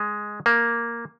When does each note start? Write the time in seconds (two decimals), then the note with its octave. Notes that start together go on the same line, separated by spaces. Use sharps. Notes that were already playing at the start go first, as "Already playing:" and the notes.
Already playing: G#3
0.46 A#3